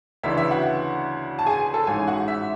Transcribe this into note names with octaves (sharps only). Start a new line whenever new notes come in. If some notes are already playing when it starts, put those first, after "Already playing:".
D2 C#3 E3 B3 D4 E5
E5
F#4 F#5
A5
G#4 G#5
A4 A5
A1 G#2 G#3 C#4 G#4 G#5
F#4 F#5
E5